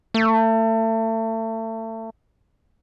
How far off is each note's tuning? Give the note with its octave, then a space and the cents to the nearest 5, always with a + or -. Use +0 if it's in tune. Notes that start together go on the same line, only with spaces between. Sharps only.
A3 +30